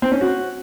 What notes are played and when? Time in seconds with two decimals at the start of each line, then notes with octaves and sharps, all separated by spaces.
0.02 C4
0.12 C#4
0.21 F#4